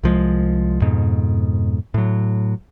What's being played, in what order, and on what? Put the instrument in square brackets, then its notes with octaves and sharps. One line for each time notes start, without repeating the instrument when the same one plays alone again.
[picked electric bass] C2 F3 G#3
F2 G#2 B2
A2 F#3